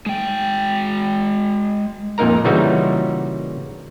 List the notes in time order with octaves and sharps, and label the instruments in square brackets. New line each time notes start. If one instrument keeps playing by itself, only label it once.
[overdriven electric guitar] G#3 G5
[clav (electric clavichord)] F2 A#2 A#3 D#4 A#4 A#5
A#2 C#3 E3 G3 D#4 F#4